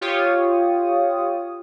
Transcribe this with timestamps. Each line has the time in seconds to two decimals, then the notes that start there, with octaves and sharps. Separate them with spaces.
0.01 F4 G4 C#5 D#6